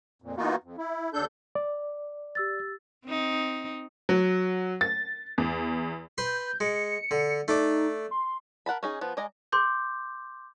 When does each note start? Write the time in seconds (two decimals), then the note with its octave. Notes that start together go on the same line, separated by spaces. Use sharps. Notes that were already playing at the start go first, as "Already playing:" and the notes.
0.22 F2 A#2
0.37 E3 A#3 B3 D#4 F4 F#4
0.63 F2
0.78 E4
1.14 D#2 D4 A4 G6
1.55 D5
2.35 G4 E6 A6
3.06 C4 D#4
4.09 F#3
4.81 A6
5.38 E2
6.18 B4 C6 G6
6.60 G#3 C#7
7.11 D3
7.48 A3 D4 D#4 D6
8.11 C6
8.66 A#4 F#5 A5 B5
8.83 C#4 D#4 G#4
9.01 F3 B3
9.17 G#3 D5 D#5 G#5 A#5
9.52 C6 D6 G6